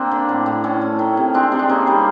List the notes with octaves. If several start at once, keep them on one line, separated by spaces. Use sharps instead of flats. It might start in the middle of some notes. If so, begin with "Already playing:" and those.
Already playing: A#3 C4 D4
D3
A2
A2
A2 C#4
A3
D#3
C3
G#3 C4 D4
C3
D4
A#3 C#4 D#4
G3